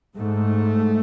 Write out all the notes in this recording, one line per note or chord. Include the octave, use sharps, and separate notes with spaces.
G#2 A3